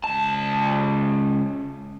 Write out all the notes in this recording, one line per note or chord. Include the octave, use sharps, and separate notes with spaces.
C#2 A5